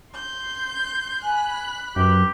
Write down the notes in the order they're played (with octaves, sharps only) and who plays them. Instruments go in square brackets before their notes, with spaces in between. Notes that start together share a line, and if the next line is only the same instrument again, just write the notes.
[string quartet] C6 G6
[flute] G#5 [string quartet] B5 F#6
[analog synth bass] F#2 [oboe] G4 [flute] B4